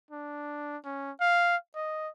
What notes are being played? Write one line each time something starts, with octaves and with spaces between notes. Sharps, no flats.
D4
C#4
F5
D#5